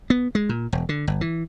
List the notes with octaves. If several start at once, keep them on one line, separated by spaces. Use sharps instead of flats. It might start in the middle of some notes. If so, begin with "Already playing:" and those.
B3
G#3
A#2
E1
D3
G1
E3